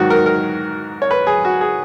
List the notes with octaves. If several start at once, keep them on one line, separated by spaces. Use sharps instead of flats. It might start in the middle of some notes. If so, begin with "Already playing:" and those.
Already playing: G#2 D#3 F#3 F#4
A#4
A#4
C#5
B4
G#4
F#4
G#4